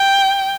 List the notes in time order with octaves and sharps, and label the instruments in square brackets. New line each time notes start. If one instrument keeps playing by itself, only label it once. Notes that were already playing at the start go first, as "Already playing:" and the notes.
Already playing: [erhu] G5